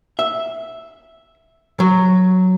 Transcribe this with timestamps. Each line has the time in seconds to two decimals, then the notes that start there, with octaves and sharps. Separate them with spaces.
0.19 E5
1.80 F#3